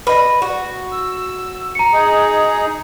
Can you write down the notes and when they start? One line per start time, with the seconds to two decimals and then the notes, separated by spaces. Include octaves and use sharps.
0.07 B4 D#5
0.42 F#4
0.92 E6
1.75 A#5 C#7
1.92 D#4 G#4